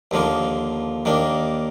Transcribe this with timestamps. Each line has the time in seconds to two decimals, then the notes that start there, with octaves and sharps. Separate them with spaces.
0.11 D#2 D3 F3 A#3 F4
1.05 D#2 D#3 A#3 D4